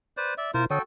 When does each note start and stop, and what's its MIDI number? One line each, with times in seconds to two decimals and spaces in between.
0.17 0.34 71
0.17 0.34 72
0.17 0.34 74
0.38 0.51 74
0.38 0.51 76
0.54 0.66 47
0.54 0.66 64
0.54 0.65 65
0.54 0.65 70
0.54 0.65 72
0.70 0.79 50
0.70 0.82 66
0.70 0.82 69
0.70 0.79 73
0.70 0.82 79
0.70 0.79 87